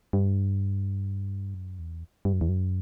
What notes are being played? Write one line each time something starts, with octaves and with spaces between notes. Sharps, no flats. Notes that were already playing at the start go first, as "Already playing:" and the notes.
G2
F#2
E2
G2
F#2
E2
F#2